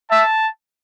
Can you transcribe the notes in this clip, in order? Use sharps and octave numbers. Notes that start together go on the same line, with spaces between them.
E5 A5